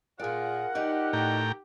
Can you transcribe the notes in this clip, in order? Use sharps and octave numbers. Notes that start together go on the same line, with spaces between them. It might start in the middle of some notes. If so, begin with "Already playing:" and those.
A#2 F4 G#4 A#4 D5 F#5
F3 D#4 G4 D5
A2 G5 A#5